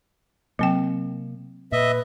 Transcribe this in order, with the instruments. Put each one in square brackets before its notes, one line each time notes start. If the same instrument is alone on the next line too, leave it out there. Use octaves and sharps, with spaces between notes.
[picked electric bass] C3 A#3 [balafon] F#3 C4 G5
[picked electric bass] A#2 [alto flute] B4 [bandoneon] D#5 E5